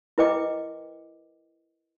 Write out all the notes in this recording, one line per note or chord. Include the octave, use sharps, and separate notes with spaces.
E4 A#4 B4 D#5 G5 D6